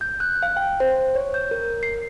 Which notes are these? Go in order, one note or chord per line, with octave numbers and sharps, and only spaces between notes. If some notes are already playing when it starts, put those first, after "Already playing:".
G6
F#6
F5
G5
C5
C#5
G6
A#4
C7